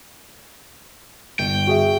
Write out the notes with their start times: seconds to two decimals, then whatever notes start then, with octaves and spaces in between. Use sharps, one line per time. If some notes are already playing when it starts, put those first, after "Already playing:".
1.39 G1 G5
1.67 F#4 G#4 E5